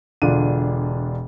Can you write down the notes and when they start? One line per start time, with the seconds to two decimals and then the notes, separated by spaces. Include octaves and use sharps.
0.22 E1 D3 D4 F4 D#7